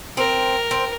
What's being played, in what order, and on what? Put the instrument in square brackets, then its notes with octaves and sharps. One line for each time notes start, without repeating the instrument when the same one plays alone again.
[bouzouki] C4 [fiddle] A#4
[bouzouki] C4